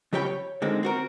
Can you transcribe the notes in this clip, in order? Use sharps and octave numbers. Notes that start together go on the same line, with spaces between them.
C#3 F#3 G4 C#5 G5 B5
C#5
D3 D#3 G#3 C4
C4 F#4 A#4